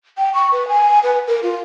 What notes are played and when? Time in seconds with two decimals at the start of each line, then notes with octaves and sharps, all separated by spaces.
0.18 G5
0.34 C#6
0.52 B4
0.68 G#5
1.03 B4
1.27 A#4
1.43 F4